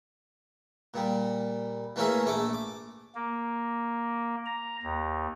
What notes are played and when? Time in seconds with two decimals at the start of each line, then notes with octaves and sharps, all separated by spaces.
0.94 A#2 G3
1.96 E3 A3 A#3 C#4 G#4 E5
2.26 A#1 A3 A4 D6
2.53 D6
3.15 A#3
4.46 A#5
4.83 D#2